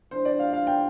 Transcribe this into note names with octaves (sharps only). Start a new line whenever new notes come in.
E3 G3 D4 F4 C5
D5
F5
F5
G5